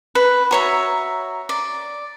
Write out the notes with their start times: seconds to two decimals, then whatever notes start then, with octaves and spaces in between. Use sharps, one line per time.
0.15 B4
0.51 F#4 C#5 E5 A#5
1.49 D5